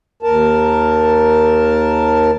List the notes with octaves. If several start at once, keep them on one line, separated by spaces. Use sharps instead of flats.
D#2 A#4 A5